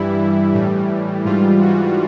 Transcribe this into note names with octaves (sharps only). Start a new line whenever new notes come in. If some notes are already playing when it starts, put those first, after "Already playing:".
Already playing: G2 E3 G3 E4
A2 E3 G3
G#2 E3 G3 F4
F#4